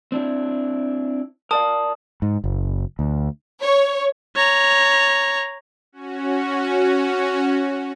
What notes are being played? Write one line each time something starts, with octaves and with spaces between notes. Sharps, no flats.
C4 D4 E4
A#4 D5 F5 A5 D#6
G#2
F#1
D2
C#5
C#5 A#5
C#4 F#4